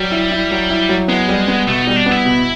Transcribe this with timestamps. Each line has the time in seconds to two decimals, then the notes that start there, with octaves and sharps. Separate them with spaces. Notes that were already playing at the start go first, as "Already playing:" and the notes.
Already playing: F#3 G3
0.11 E4
0.31 E4
0.51 F#3
0.70 E4
0.89 F#3
1.08 G#3 B3
1.29 G3
1.48 B3
1.67 B2 A3
1.81 D#4
1.87 G3
1.96 D4
2.06 B3 E4
2.25 B2